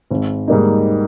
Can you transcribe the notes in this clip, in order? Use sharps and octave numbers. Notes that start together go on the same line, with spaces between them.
G#1
G#2 G3 A#3 D#4